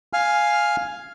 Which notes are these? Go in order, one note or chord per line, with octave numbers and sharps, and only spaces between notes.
F5 G#5 F6